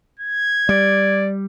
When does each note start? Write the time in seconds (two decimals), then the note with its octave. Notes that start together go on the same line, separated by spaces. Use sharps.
0.19 G#6
0.69 G3 D5